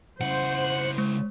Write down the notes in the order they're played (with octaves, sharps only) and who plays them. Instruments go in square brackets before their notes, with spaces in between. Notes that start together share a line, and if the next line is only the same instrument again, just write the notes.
[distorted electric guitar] C#3 E4 [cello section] C5 [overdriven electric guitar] F#5
[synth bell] G#3